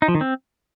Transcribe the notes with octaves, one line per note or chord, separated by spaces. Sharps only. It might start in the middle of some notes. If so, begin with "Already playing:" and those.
D#4
F3
D#3
C4